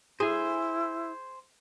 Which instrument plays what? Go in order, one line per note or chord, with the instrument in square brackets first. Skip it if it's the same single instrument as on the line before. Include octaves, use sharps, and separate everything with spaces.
[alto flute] E4 [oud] G#4 [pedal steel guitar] C5 G#5